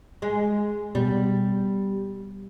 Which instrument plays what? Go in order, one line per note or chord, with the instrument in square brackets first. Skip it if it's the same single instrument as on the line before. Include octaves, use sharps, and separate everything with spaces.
[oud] G#3
[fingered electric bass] B2 [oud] G3